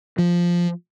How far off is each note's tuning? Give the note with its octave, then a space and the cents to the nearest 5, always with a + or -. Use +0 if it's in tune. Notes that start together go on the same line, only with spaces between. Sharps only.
F3 +0